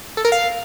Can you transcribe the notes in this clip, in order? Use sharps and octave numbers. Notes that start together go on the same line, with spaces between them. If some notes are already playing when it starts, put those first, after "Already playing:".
A4
A#4
F5